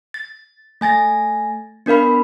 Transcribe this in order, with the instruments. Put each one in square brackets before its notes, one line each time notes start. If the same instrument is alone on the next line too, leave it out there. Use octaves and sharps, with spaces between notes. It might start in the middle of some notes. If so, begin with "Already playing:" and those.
[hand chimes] A6
A3 G#5 A6 A#6
B3 D4 A#4 F5 B5